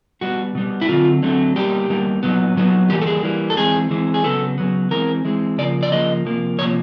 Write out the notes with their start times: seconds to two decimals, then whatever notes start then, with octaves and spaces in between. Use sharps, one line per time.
0.21 B2 G3 B3 F#4
0.55 B2 G3 B3
0.81 E4
0.89 D3 F#3 A3 C4 F4
1.23 D3 F#3 A3 C4
1.56 B2 G3 A#3 G4
1.89 B2 G3 A#3
2.23 A#2 F#3 B3
2.56 A#2 F#3 B3
2.90 E3 G3 A#3 G4
3.01 A4
3.07 G#4
3.23 E3 G3 A#3
3.50 A4
3.57 E3 G#3 C4 G#4
3.91 E3 G#3 C4
4.14 G#4
4.24 C#3 F#3 B3 A4
4.58 C#3 F#3 B3
4.91 E3 G#3 C4 A#4
5.25 E3 G#3 C4
5.58 C#3 F3 A#3 D5
5.83 D5
5.92 C#3 F3 A#3 D#5
6.25 C3 F3 A#3
6.59 C3 F3 A#3 C#5